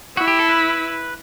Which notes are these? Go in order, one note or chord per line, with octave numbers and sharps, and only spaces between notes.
E4 F#4
G4
A4
B4